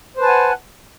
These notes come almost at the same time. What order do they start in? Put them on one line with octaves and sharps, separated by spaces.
C5 B4 A5 G#5 F#5